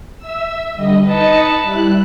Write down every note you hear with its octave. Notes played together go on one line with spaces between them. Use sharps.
E5 E6
D3 G3 D#5
D#4 B4 D#5 A5 C#7
G3 E4 F#6